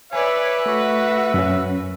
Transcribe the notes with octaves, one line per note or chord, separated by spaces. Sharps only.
B4 C#5 D5 E5 G#5
A3 F#4 C#6
F#2 C#4